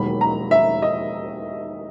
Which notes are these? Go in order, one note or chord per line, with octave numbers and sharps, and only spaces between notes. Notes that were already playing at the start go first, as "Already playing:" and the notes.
Already playing: E1 D#2 D#3 F#3 B5
A#5
E5
D#5